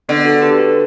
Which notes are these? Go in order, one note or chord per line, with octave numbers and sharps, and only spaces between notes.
D3 B3
F#4 A4
G4 B4
F#4 A4